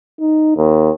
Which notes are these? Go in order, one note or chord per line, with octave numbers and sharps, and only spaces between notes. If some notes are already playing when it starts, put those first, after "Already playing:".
D#4
D#2